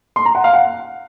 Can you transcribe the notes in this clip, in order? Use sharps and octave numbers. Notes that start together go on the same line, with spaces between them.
C6
A#5
F#5
F5
F#5